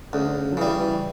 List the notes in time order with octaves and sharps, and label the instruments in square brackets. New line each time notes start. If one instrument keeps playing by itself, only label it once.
[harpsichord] D2 [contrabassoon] C#3
[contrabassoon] D3
C#3
F#3
[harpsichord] C#3 G3 [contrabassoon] E3
[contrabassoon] E3